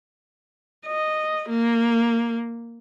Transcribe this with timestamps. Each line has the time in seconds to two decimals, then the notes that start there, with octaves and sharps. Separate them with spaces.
0.86 D#5
1.49 A#3